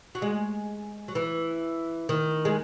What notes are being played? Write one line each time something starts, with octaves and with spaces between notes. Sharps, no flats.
F#3
G#3
F#3
E3
D#3
G#3